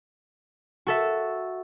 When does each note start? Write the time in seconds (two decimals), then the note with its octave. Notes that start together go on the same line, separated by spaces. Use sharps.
0.87 F#4 A4 E5